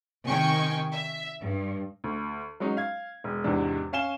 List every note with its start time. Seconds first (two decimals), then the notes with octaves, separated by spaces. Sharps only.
0.25 C3 D#3 G5 G#5 C#6
0.93 E5
1.42 G2
2.04 D2
2.60 F#3 G#3 C#4 D#4
2.77 F5 G#6
3.24 E1
3.44 E2 G#2 C3 E3 D4
3.93 C#4 F5 G#5 E7 G7